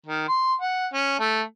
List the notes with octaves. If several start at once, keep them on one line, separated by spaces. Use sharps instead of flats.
D#3
C6
F#5
C#4
A3